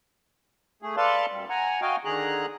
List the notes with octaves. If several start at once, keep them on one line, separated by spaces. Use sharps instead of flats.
A3 G#4
A4 B4 D5 F5 A5 C6
F#2 G3
F#5 G#5 A#5
F#4 D#5 F5 G5 G#5
D3 D#3 G#4 A#5 F#6